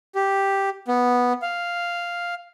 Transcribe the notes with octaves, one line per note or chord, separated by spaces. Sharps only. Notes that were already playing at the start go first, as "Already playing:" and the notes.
G4
B3
F5